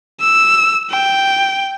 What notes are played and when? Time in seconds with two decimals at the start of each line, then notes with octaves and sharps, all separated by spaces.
0.21 E6
0.90 G5